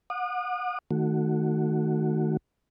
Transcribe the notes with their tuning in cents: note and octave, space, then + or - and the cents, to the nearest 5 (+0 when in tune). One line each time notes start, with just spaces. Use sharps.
F#5 -30 D#6 -45
D#3 +0 A3 +0 F#4 +0